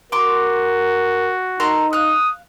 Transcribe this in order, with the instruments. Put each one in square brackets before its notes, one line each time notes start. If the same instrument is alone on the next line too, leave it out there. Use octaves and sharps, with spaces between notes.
[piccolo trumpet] F#4 [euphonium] A#4 [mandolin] C6 D6
[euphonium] D#4 [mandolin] A4 A#4 C6
[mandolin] F5 F#6 [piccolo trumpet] D#6